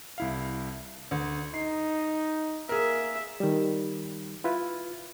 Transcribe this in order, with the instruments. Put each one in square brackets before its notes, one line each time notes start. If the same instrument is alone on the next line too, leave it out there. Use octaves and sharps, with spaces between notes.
[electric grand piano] C2 E4 F5
[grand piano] D2
[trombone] D#4 [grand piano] C7
[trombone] A#3 [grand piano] G#4 A#4 [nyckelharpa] E5
[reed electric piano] D#3 G3
E4 F4 B4